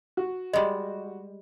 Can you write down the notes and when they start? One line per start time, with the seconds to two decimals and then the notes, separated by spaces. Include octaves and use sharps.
0.17 F#4
0.53 G3 G#3 D#5